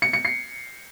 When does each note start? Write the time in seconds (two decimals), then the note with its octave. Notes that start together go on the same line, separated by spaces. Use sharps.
0.02 C#7
0.13 C#7
0.25 C7